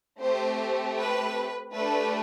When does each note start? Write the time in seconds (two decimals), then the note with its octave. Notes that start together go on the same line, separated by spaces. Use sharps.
0.20 A3 C4 G4 C5
0.98 B4
1.74 A3 D4 G4 B4